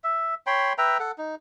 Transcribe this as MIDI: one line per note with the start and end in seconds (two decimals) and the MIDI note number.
0.04 0.34 76
0.47 0.73 73
0.47 0.73 79
0.47 0.73 83
0.47 0.73 84
0.78 0.98 71
0.78 0.98 76
0.78 0.98 79
0.78 0.98 82
1.00 1.11 69
1.00 1.11 78
1.18 1.35 63